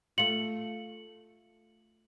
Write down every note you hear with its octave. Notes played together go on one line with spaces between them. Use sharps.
A3 F4 C#7 F#7